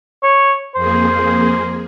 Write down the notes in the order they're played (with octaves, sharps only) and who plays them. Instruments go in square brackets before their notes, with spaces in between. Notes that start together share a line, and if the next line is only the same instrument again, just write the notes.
[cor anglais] C#5
[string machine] F2 A#3 G#4 [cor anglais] C5